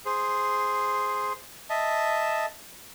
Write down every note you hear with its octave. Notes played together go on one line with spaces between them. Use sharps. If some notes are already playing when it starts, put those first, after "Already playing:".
G#4 C5
D#5 E5 A5